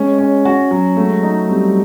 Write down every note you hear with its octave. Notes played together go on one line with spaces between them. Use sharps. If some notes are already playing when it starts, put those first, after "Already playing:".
Already playing: G#3 C#4
C#4
F#4
F#3
G#3 A3
D#4
G3 C4